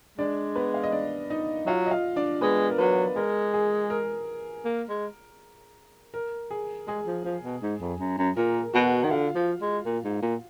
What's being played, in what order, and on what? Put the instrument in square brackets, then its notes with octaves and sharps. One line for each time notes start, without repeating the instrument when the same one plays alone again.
[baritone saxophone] G#3 [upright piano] D4 D5
[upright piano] B3 B4
F5
D#5
D4 D5
D#4 D#5
[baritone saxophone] F#3 [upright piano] F4 F5
[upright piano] D#5
F4 F5
D4 D5
[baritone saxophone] G#3 [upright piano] B3 B4
[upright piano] A#4
[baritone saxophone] F#3 [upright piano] B3 B4
[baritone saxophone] G#3 [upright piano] A#4
[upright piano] G#4
A#4
[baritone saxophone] A#3
G#3
[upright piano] A#4
G#4
[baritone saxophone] G#3 [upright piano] G#4
[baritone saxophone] F3
F3
B2
G#2
F2
F#2
F#2
[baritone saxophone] A#2 [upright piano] A#4
[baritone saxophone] B2 [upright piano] F#4 F#5
[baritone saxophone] D#3 [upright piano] F#5
[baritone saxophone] D3 [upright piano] F4 F5
[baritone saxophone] F3
G#3
A#2
G#2
A#2